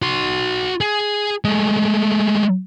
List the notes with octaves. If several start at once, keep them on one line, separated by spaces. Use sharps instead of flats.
F#4 C6
G#4
G#3 A3